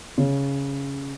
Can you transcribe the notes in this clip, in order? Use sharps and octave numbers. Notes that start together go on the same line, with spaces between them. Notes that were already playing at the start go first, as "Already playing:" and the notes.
C#3